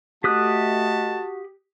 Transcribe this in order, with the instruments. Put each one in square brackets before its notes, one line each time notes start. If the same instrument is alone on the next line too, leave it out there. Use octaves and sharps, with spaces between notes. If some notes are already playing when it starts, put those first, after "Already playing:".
[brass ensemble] A3 D#5 [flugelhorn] F#4 [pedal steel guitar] G4 D#6 F#6 [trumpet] A5